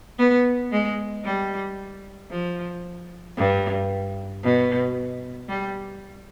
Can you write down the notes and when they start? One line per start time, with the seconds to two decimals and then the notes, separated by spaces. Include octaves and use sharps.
0.19 B3
0.72 G#3
1.25 G3
2.31 F3
3.37 G2
4.43 B2
5.48 G3